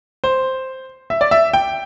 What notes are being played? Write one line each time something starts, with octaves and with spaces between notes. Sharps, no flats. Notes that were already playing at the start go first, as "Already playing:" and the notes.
C5
E5
D5
E5
G5